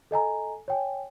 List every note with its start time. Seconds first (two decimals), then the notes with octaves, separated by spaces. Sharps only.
0.11 A4 D#5 G#5 A#5
0.68 C#5 G5 G#5